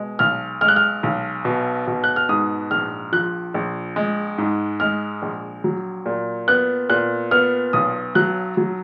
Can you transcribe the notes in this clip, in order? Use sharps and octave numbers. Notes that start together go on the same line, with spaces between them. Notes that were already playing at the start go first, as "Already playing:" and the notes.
Already playing: B2 G#3
B1 F6
G#3 F6
F#6
F6
B1
B2
B2
F#6
F6
G#2 D#6
A#1 F6
F3 F#6
A#1
G#3
G#2
G#3 F6
A#1
F#3
A#2
B3 F#6
A#2 F#6
B3 F6
B1 D#6
F#3 F#6
F#3